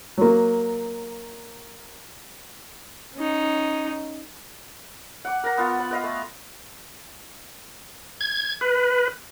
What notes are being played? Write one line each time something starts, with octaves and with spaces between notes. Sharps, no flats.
F#3 A#3
C#4 D#4
F#5 D6
A#4 A#5
B3 F4
B5
B4 D#5 F5
A3
G#6
B4